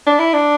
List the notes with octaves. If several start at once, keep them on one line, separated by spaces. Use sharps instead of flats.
D4
E4
D4